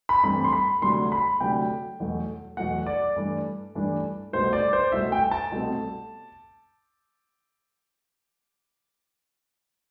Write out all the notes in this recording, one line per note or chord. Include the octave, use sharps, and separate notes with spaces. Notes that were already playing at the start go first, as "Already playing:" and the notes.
B5
G2 E3 A3 C4 B5
C6
B5
D2 C3 F#3 A3 D4 C6
B5
D2 C3 F#3 A3 D4 G5
E2 B2 F#3 A3
E2 B2 F#3 A3 F#5
D5
G2 E3 A3 D4
G2 E3 A3 D4
C2 B2 A3 C5
D5
C5
C2 B2 A3 E5
G5
A5
C2 B2 A3 C4